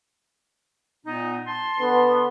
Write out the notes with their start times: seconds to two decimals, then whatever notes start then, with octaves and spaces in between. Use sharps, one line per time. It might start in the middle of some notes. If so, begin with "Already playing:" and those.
1.05 A#2 B3 D#4
1.47 A5 C6
1.80 D3 B3